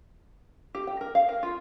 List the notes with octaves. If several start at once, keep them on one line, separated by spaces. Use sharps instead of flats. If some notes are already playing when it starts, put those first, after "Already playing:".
G4
G5
A#4
F5
A#4
F4